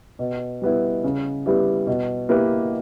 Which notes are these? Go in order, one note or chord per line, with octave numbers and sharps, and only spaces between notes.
B2
G3 B3 E4
C#3
G3 B3 E4 G4
B2
A#3 E4 G4 B4